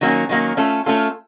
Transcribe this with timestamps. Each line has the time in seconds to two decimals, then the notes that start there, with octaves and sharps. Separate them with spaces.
0.01 D#3 F#3 A#3 C#4
0.29 D#3 F#3 A#3 C#4
0.57 A3 C#4 F4 A4
0.86 A3 C#4 F4 A4